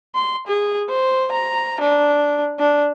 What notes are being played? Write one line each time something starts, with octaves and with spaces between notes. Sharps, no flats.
C6
G#4
C5
A#5
D4
D4